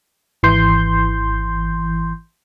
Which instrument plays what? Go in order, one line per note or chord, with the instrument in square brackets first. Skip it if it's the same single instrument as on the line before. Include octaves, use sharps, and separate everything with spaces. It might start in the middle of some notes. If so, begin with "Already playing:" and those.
[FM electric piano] G#1 E3 C6 G6